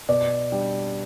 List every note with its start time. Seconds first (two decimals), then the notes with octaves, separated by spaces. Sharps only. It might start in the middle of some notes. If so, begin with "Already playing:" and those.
0.09 B2 D5
0.52 G3 D4 G4